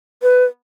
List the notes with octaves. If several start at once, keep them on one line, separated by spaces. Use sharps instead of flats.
B4